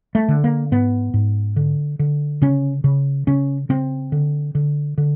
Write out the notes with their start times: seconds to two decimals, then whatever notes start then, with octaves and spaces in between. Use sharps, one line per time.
0.15 A3
0.28 D3
0.44 A#3
0.72 G#2 B3
1.14 G#2
1.56 D3
1.99 D3
2.42 C#3 C#4
2.84 C#3
3.27 C#3 C#4
3.69 C#3 C4
4.12 D3
4.55 D3
4.98 D3